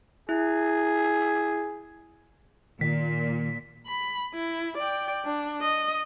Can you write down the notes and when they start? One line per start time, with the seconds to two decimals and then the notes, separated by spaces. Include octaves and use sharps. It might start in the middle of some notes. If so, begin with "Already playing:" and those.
0.29 E4 G#4
2.81 A#2 D#3 B6
3.86 B5
4.34 E4
4.78 D5 G5
5.25 D4
5.61 D#5